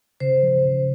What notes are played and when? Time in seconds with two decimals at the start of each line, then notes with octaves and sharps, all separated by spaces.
0.20 C#3 C5
0.43 F3
0.64 C#3